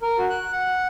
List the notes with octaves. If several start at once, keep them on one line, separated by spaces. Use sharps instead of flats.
A#4
F#4
F#6
F#5